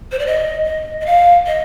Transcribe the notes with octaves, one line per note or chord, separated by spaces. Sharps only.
C5
D5
D#5
D#5
D#5
F5
D#5